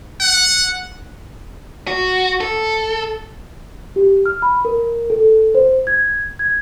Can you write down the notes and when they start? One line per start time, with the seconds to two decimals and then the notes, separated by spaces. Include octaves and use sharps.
0.20 F#5
1.87 F#4
2.41 A4
3.96 G4
4.26 F6
4.42 B5
4.65 A#4
5.10 A4
5.55 C5
5.87 G#6
6.39 G#6